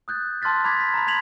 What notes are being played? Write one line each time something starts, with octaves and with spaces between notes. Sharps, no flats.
D#6 F#6 G6 A6
A5 C6 F6 F#6 A6 B6
B5 D6 G#6 B6
B6
A#5 B5
B5 G#6 B6 F7 F#7